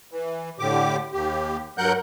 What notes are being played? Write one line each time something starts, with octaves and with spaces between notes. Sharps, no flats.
E3
A2 D3 G4 D6
D#2 G4
G2 F#3 A#4 F#5 F#6 G6